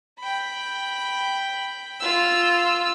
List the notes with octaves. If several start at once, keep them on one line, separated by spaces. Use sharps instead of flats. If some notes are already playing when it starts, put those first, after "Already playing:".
G5 B5
F4 E6